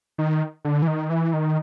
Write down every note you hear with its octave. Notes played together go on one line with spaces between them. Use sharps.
D#3
D3
E3
D#3
E3
D#3